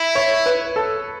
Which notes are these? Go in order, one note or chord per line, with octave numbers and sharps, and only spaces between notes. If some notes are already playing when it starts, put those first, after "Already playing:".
Already playing: E4
C#5
B4
A4